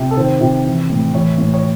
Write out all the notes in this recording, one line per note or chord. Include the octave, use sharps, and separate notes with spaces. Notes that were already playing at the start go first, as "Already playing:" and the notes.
Already playing: C3
A4
D#3 C5
C3
E3
A2
E3 C#5
A2
C#5